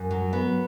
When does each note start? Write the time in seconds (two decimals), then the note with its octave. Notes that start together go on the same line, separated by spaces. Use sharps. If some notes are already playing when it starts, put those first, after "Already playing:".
Already playing: F#2
0.11 F#3
0.33 B3